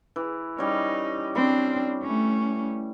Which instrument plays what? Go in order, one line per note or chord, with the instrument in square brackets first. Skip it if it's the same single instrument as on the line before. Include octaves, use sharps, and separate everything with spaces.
[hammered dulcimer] E3
[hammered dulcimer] G3 C#4 [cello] D#4
[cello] C4 D4 [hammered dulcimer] B5
[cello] A3 C#4